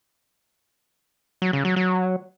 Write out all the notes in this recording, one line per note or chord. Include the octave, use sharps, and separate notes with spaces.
F#3
C#3
F#3
F#3